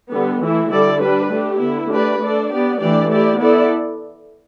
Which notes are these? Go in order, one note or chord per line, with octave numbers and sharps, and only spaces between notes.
D3 G3 B3
E3 A3 E4
D3 G3 E4 A4 D5
G3 D4 G4 B4
A3 D4 G4
D3 B3 E4
A3 D4 G4 B4 D5
A3 D4 A4 D5
B3 G4 D5
E3 A3 D4 G4 D5
A3 E4 G4 D5
B3 E4 A4 D5